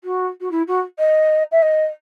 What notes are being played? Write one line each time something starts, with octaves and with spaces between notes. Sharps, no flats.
F#4
F#4
E4
F#4
D#5
E5
D#5